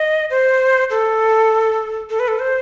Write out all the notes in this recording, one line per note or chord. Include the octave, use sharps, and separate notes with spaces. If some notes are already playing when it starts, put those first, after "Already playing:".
Already playing: D#5
C5
A4
A4
B4
A4
C5